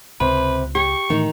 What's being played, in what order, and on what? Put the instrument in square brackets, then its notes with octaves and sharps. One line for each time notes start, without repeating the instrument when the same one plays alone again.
[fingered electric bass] C#2 [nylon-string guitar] C3 [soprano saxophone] B4
[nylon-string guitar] G4 [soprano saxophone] C#6
[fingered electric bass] A2 E3 A3 [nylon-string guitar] D#3 D#4